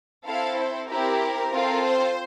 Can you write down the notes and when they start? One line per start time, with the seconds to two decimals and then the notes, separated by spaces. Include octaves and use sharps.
0.25 C4 E4 A4 F5
0.57 C5
0.89 C4 E4 G4 A#4
1.52 C4 F4 A4
1.83 C5